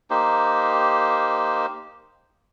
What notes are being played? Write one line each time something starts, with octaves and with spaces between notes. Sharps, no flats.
A#3 D#4 G4 C5